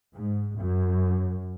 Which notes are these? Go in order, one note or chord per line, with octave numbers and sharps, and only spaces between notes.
G#2
F#2